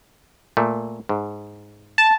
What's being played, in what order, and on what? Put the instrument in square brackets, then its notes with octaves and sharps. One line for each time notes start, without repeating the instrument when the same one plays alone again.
[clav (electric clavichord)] A#2 A3
G#2
[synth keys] A5